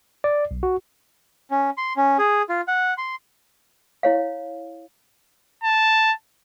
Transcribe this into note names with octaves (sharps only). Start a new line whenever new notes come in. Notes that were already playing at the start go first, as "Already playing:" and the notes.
D5
B1
F#4
C#4
C6
C#4
G#4
F4
F#5
C6
E4 C#5 F5
A5